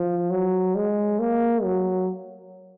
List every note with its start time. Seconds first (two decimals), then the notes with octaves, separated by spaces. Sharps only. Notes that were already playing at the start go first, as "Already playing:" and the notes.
Already playing: F3
0.30 F#3
0.75 G#3
1.19 A#3
1.63 F#3